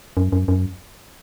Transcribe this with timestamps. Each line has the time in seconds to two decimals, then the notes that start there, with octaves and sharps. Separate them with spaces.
0.17 F#2
0.32 F#2
0.48 F#2